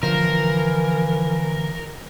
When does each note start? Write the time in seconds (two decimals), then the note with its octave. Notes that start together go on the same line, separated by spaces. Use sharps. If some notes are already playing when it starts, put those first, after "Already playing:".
0.03 D3 E3 F3 A#4